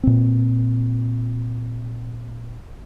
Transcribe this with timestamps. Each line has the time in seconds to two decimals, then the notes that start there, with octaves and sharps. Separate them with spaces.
0.03 A#2 C4